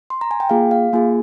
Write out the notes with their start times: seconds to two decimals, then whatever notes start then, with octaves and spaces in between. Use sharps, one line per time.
0.10 C6
0.21 A#5
0.31 G#5
0.40 G5
0.49 A#3 F4 G#4 F5
0.71 F5
0.93 A#3 F4 G#4 G#5